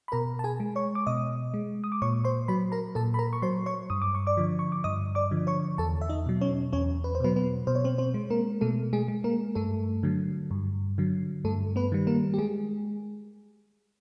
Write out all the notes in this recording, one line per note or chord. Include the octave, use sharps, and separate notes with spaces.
B5
B2 A#4 A#5
A5
G#4 G#5
G#3
C#5 C#6
D6
B2 D#5 D#6
G#3
D#6
D6
A#2 C#5 C#6
C5 C6
F#3 B4 B5
A#4 A#5
A#2 A4 A5
B5
A#4 A#5
C#6
F#3 C5 C6
C#5 C#6
G2 D#6
D6
C#6
D5 D6
D3 F3
C#6
D6
G2 D#5 D#6
D5 D6
D3 F3
C#5 C#6
E2 A4 A5
E5
D#4 D#5
B2 F#3
C#4 C#5
E2 C#4 C#5
B4
C5
B2 F#3 B3 B4
B3 B4
B2 C5
C#5
C4 C5
C4 C5
G#3
A#3 A#4
B2 A3 A4
G#3 G#4
G#3
A#3 A#4
G2 A3 A4
D3 F#3
G2
D3 F#3
G2 A3 A4
B3 B4
D#3 G3
A#3 A#4
G4
G#3 G#4